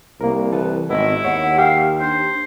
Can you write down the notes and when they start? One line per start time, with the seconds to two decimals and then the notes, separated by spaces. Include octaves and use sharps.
0.21 C2 A#3 A#4
0.53 E3 A4 B4
0.90 G#1 B3 E4 D#5
1.24 D#2 C#5 F#5
1.58 G4 F5 G5
2.00 D4 C5